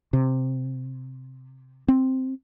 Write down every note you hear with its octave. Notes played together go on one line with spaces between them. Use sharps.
C3
C4